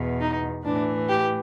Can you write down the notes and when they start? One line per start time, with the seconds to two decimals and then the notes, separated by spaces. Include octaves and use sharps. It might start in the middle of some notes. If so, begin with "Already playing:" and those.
Already playing: E2 B2
0.21 D#4
0.64 A2 E3 D4
1.08 G4